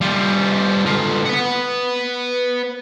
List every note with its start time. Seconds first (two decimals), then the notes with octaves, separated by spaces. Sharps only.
0.01 G3 F4
0.86 D3 F4
1.26 B4 F#5